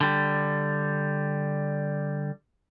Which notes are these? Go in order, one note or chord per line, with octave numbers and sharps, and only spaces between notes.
D3 G3